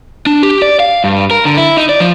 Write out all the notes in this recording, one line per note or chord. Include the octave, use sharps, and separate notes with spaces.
D4
G4
D5
F5
G2
A#4
D3
E4
D#4
D5
F3